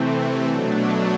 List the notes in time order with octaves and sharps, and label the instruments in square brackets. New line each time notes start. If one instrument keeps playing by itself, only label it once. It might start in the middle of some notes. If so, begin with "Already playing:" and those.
Already playing: [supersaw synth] C3 E3 A3 C4
B2 F#3 A3 D4